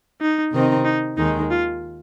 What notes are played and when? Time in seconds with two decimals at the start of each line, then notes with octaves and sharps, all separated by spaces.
0.21 D#4
0.53 C3 D#3 C4 D#4
0.85 D#4
1.17 D#2 D#3 G#3 D#4
1.51 F4